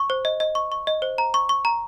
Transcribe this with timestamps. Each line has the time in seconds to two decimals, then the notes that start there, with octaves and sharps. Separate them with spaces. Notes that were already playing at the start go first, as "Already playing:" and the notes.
Already playing: C#6
0.10 C5
0.25 D#5
0.40 D#5
0.55 C#6
0.72 C#6
0.87 D#5
1.02 C5
1.18 A#5
1.34 C#6
1.49 C#6
1.65 A#5